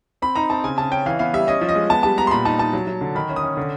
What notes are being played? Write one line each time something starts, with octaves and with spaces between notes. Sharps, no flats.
C4 B5
D#4 A#5
C4 A5
C#3 G#5
C#3 A5
C#4 G5
E3 F5
B3 F5
G3 E5
C#4 D#5
F3
D#5
G#3
B3 A5
G3 A5
B3 A#5
C6
A#2 B5
D#4 A5
D#4 A5
F#3
F#3
D3
D#3 B5
C#4
D#6
C#4
D3